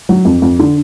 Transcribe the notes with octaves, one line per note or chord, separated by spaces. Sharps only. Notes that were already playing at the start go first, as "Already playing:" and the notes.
F#3
F2
F2
D3